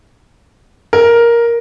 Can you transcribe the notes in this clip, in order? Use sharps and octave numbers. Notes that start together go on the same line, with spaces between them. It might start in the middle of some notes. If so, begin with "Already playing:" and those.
A#4